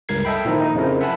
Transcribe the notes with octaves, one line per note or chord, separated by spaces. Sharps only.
C#2 G2 A#4 G#6 C7
A4 D#5 E5 G5 B5
A#2 D#3 F3 D#4 E4
D#4 D#5
F2 C#3 F3 E4 A#4
E5 F#5 G#5 A5 B5